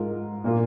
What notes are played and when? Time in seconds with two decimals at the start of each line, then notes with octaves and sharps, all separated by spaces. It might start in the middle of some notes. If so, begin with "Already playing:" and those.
Already playing: G#2 G#3 F4 A#4
0.44 A#2 A#3 F4